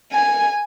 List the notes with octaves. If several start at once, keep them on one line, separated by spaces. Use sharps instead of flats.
G#5